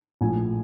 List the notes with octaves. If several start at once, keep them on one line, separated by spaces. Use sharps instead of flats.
A#1 A2 F3 G#5